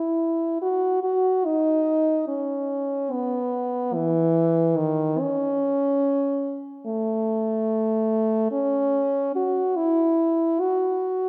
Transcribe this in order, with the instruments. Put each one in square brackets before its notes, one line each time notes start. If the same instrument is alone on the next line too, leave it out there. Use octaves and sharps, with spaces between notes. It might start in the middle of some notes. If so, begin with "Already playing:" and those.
Already playing: [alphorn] E4
F#4
F#4
D#4
C#4
B3
E3
D#3
C#4
A3
C#4
F#4
E4
F#4